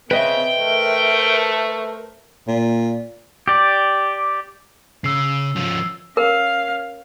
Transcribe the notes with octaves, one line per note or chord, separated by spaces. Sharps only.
C#3 C4 B4 D#5 E5 G5
A3 A#4 C5
A#2
G4 D5
C#3 E6 C7
F3 C#4
C#4 A#4 F5